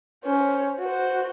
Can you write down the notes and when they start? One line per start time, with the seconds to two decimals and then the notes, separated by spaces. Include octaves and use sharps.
0.24 C#4 C5
0.79 F#4 C5